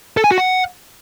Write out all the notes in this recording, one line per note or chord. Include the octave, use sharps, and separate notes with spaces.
A4
G#5
F#4
F#5